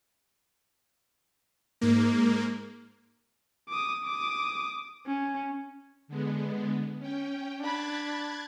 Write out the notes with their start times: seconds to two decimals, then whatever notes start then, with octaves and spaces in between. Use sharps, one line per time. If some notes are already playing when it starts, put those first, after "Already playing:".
1.81 G#2 A#3
3.69 D6 D#6
4.04 D6 D#6
5.06 C#4
6.08 D3 G#3 B3
6.99 C#4 G5
7.60 D4 B5 F#6 G#6 A6